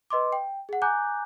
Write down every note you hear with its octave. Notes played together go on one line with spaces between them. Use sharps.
B4 D#5 C6 D6
G5
G#4 F#5
G#5 A#5 D6 F#6 G6